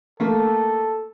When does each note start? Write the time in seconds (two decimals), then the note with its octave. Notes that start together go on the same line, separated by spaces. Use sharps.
0.20 A3 A#3 A4